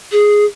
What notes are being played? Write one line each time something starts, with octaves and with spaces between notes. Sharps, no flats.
G#4